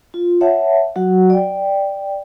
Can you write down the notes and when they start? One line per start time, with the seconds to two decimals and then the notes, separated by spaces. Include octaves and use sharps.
0.14 F4
0.41 C#5 E5 F#5 A5
0.96 F#3 F#4 F#5
1.30 D5 G5